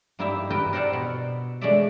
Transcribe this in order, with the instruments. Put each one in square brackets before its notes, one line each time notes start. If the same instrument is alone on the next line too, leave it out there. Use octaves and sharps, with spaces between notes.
[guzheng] G2 A#3 D#4 E4 G4 E5
G4 A#4 B4 G5 A5
A#4 C5 D5 E5 F#5 A5
B2
G#3 A3 D4 C#5 D5 E5